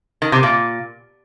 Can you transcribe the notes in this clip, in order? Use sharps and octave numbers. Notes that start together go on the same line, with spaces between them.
D#3
C3
A#2